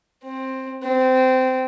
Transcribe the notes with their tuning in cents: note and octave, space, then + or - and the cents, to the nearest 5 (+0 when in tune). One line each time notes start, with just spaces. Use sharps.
C4 +10
C4 -20